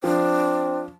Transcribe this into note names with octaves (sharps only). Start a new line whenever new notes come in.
F3 C4 D4